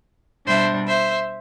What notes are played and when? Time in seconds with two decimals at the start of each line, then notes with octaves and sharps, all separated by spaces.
0.46 B2 G3 D4 C5 E5
0.88 C5 E5